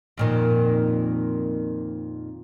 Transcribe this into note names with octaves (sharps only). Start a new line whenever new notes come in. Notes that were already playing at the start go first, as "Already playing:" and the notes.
F2 A#2 D#3